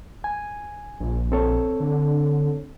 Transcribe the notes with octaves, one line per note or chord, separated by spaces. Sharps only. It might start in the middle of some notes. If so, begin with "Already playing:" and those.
G#5
A#1
C4 A4 C#5
D3